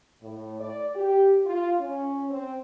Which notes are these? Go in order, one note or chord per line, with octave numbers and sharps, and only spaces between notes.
A2
D5
G4
F4
C#4
C4